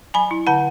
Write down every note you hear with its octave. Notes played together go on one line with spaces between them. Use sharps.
F#3 G#5 B5
E4
D3 F#5 A5